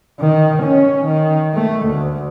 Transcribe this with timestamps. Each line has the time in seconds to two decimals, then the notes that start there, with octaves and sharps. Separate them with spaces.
0.20 D#3
0.63 C#4
1.05 D#3
1.54 A3
1.86 D2